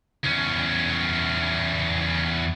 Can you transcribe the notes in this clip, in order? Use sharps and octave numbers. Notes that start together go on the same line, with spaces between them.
E2 C#4